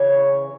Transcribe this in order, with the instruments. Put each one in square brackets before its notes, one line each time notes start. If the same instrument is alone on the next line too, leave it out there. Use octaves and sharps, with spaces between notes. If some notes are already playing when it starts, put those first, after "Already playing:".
Already playing: [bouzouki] C#3 E3 C#5